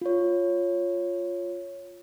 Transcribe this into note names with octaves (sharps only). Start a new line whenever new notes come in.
F4 C#5